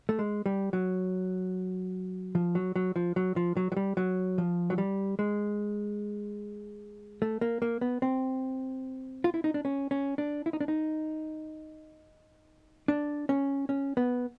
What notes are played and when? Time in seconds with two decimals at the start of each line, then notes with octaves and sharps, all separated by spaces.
0.09 A3
0.19 G#3
0.46 G3
0.73 F#3
2.35 F3
2.55 F#3
2.76 F#3
2.96 F3
3.16 F#3
3.36 F3
3.57 F#3
3.72 F#3
3.77 G3
3.97 F#3
4.38 F3
4.70 F#3
4.78 G3
5.19 G#3
7.22 A3
7.41 A#3
7.62 A#3
7.81 B3
8.02 C4
9.24 F4
9.34 E4
9.44 D#4
9.54 D4
9.65 C#4
9.91 C#4
10.18 D4
10.46 E4
10.53 D#4
10.61 D4
10.68 D#4
12.88 D4
13.29 C#4
13.69 C#4
13.97 B3